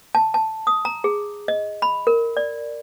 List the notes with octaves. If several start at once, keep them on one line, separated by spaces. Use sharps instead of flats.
A5
A5
D#6
A#5
G#4
D#5
B5
A#4
D5